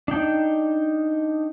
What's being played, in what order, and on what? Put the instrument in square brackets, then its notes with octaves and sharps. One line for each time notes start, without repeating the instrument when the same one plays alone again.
[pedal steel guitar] D4 D#4 G5